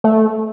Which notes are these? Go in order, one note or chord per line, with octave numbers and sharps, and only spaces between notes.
A3